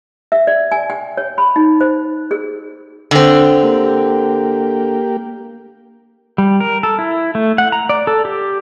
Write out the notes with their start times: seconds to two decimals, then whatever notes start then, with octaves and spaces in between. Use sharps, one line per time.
0.32 E5
0.47 D5
0.72 G#5
0.90 G5
1.17 C#5
1.38 B5
1.56 D#4
1.81 C5
2.31 G#4
3.11 D3 C4
3.63 A#3 G4
6.38 G3
6.60 A#4
6.83 A4
6.99 E4
7.35 A3
7.58 F#5
7.72 A#5
7.89 D5
8.07 A4
8.25 G4